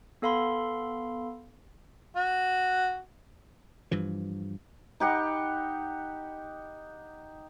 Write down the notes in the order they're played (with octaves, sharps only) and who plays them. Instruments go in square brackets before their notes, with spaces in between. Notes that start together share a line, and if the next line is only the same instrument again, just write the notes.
[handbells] B3 A4 F5 B5 C6
[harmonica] F#4
[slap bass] G2 E3 F3
[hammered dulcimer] D#4 G4 F#5 B5